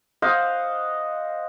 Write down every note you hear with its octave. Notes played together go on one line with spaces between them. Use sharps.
C5 D#5 F5 F#5